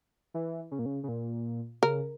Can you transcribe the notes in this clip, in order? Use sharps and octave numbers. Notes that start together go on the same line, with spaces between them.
E3
C#3
A#2
C#3
C#3
A#2
C#3 A#4